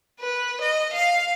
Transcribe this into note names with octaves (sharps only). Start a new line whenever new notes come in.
B4
D#5
F5